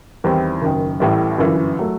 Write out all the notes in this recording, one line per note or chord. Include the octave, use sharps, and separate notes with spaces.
E2 D#3 G3 C4 E4
F#1 F#2 D#3
A1 A2 E3 G3
G1 F#2 E3
F#3 A3